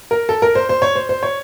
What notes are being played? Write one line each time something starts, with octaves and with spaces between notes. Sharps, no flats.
A#4
A4
A#4
C5
C5
C#5
C5
C5
C#5